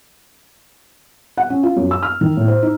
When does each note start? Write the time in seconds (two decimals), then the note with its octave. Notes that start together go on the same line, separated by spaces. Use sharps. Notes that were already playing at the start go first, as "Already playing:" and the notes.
1.37 F#5
1.50 C#4
1.63 F4
1.76 F#2
1.91 E6
2.03 F6
2.21 D#3
2.37 A2
2.48 C5
2.62 D#4